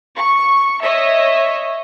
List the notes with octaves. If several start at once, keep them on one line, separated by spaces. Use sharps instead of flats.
C#6
C#5 D#5 E5